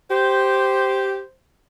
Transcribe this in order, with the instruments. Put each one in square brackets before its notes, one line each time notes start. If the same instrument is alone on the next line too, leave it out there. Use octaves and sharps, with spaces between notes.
[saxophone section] G4 [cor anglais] C5